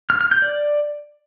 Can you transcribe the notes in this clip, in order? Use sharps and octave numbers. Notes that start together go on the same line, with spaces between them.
F6
F6
G6
D5